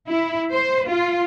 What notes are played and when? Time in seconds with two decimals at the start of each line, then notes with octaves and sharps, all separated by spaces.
0.10 E4
0.52 C5
0.90 F4